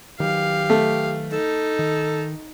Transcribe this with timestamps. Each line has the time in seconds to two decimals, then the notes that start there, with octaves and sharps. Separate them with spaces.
0.20 D#3 F#3 G4 F5
0.70 A3
1.32 D#4 A4
1.79 D#3